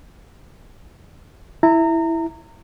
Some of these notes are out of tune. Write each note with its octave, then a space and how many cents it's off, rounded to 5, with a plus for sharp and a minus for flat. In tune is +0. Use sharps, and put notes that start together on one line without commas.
E4 +0 A#5 -30